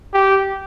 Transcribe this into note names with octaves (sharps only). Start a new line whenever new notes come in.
G4